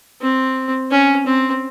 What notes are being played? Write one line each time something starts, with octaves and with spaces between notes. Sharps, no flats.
C4
C#4
C4